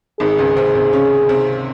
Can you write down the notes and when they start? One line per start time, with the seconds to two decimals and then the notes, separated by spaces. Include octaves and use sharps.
0.20 G#1 G#2 G#4
0.38 C#2 C#3
0.56 C3 C4
0.75 C3 C4
0.93 C#3 C#4
1.29 C3 C4